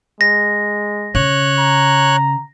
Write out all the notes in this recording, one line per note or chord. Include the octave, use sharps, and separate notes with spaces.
G#3 A#6
C#3 C#5 F#6
A#5